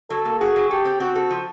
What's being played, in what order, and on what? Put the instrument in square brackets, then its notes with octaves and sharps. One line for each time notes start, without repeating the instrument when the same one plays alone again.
[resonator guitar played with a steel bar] F#3 [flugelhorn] A4
[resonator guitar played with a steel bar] A#3
[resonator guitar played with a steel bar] F#4 [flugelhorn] G#4
[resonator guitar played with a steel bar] F#3
[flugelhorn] G4 [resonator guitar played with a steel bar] A4
[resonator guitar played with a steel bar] C4
[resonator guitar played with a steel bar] C4 [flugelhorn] F#4
[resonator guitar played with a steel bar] A4
F3